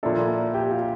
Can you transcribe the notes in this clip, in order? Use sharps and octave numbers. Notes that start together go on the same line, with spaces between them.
A#2 F3 A#3 D4 E4 A4 E5
G4 G5
F4 F5